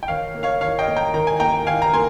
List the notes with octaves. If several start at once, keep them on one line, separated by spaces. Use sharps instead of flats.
G5
D#3 C#5 F5
A#3
C#5 F5
D#3 C#5 F5
D#5 G5
A#3
G5 A#5
D#3 A#5
G#5
A#3 G5 A#5
D#3 F5 G#5
A#5
A#3 G#5 C6